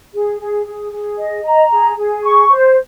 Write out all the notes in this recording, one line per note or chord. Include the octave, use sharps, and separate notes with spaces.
G#4
G#4
G#4
G#4
D#5
A#5
G#4
G#4
C#6
C5